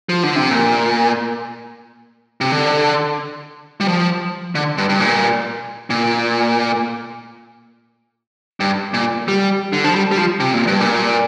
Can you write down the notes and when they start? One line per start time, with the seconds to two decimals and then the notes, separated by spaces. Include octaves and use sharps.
0.09 F3
0.23 D3
0.36 C3
0.51 A#2
2.41 C3
2.52 D3
3.80 G3
3.88 F3
4.55 D3
4.78 G2
4.89 G2
5.00 A#2
5.90 A#2
8.60 G2
8.94 A#2
9.28 G3
9.73 D3
9.84 F3
9.95 G3
10.11 G3
10.18 F3
10.40 C3
10.54 A#2
10.67 G2
10.81 A#2